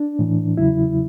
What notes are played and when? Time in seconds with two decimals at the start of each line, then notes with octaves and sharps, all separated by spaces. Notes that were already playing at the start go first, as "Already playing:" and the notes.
Already playing: D4
0.19 A2 E3
0.57 E2 C#3 F#3 E4